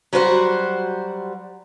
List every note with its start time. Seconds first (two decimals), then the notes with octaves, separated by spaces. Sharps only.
0.13 F#3 G3 F#4 C5 F5 F#5